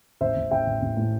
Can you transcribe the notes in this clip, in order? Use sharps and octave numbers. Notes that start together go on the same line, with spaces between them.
A1 C5 E5
A1
A1 E5 G5
A1
A1
A2